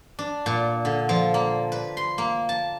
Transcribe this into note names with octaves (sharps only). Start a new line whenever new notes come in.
D4
A#2
D3
F3
A#3
B4
C6
A#3
A5